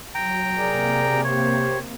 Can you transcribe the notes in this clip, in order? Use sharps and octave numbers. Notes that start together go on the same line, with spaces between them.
F#3 G5 A#5
C3 A#3 G#4 A#4 D5
G4 C5 C#5